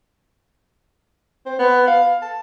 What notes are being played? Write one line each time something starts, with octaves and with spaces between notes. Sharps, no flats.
C4
B3
F5
A5